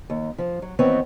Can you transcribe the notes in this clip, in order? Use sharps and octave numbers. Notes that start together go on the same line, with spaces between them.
D#2
F3
F#3
D#2 E3 B3 C4 C#5 D#5